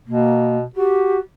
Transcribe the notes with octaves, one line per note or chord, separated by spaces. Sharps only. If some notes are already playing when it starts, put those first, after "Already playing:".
B2 A#3
F#4 G4